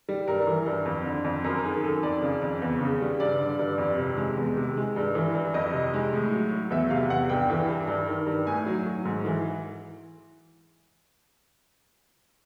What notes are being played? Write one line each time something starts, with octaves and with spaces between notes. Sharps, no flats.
G3
G2 A#4
E3
G2
F2
D3
F2
F#2 A#4
D#3 G#4
F#2 A4
F2 D5
C#3
F2
E2
C#3
G3
G2 D5
D3
G2
F2
C3
G#3
E2
C3
G#3
G2
E3
G2
F2 D#5
C3
G#3
A2
F#3
F#3
E2 E5
C3 F5
E2 F#5
G2 G5
E3
G2
G2
D#3
G2
A2 G#5
F#3
F#3
G#2
E3